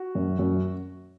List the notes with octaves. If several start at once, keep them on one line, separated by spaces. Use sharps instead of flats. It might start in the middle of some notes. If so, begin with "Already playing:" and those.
Already playing: F#4
F#2
F#2